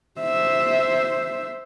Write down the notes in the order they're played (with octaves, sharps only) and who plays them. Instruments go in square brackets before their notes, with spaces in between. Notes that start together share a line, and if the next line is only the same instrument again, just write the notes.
[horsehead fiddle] C5 E5